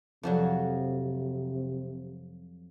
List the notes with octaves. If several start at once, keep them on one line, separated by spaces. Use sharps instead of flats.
F2 C3 F3 F#3